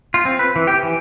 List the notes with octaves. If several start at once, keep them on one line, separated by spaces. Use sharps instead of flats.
F4
C4
B4
E3
G4
E3